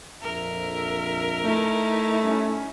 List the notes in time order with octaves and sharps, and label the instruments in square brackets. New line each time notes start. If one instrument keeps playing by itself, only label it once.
[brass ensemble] A#1 F2 E5 [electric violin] A#4
[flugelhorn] A3 [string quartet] D#4 E4
[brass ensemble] G3 C#4